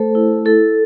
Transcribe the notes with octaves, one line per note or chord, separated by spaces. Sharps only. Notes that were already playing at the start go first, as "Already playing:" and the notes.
Already playing: A3 A4 C5
E4
E4 A4